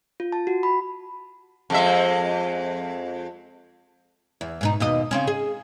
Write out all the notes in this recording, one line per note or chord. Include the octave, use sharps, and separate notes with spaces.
F4
A5
F#4
B5
F2 G#3 E5
E2
G#2 B2 D#4
D#2 B2 D#5
C#3 C4 C#4
G#4